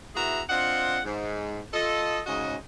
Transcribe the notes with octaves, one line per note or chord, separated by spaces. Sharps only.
B3 E4 F#4 G#4 E5 A#5
C4 D4 F4 D#5 F#5
G#2
F4 A4 D#5
G#2 C#3 C#4 F#4 D#5